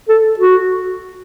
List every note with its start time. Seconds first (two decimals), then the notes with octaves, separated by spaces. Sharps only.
0.09 A4
0.39 F#4